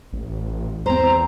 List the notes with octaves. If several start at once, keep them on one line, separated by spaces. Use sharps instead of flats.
A1
E2 C4 C5 A#5